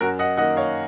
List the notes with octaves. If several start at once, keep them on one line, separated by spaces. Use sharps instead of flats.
F#2 F#4 A#4
D#5 F#5
D#3 A#3 D#5 F#5
C#5 F5